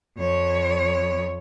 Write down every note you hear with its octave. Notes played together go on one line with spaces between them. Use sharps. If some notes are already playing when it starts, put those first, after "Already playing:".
F2 C#5